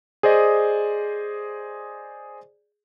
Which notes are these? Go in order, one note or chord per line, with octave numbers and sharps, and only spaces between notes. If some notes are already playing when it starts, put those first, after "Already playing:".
G#4 C5 D5 D#5